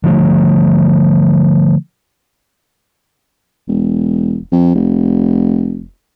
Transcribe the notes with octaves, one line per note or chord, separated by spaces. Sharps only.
D3 F3 A3
E1
F2
F1